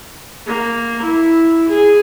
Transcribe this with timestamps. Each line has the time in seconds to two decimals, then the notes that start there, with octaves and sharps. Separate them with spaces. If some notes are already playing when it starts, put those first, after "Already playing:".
0.47 A#3
1.02 E4
1.69 G#4